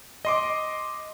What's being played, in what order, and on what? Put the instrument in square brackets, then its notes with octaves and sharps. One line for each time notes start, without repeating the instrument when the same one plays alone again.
[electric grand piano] D#5 C6 D6